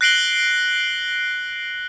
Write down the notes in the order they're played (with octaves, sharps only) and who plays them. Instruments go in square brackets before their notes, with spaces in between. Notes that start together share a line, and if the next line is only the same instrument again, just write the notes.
[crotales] F#6 A#6 C7 D7 F#7 G7